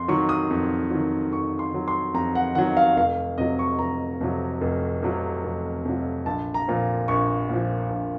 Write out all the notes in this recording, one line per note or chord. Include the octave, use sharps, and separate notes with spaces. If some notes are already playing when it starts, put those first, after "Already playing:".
Already playing: F2 C6
D#3 F#3 C#6
D#6
F2
D#3 F#3
F2 C#6
C6
D#3 F#3
C6
F2 A#5
F#5
D#3 F#3 F#5
F5
F1 F5
F2 C3 F#3 D#5
C#6
F1 A#5
F2 C3 F#3
F1
F2 C3 F#3
F1
F2 C3 F#3
A#1 A5
A#5
A#2 F3
A#1 C#6
A#2 F3
A#1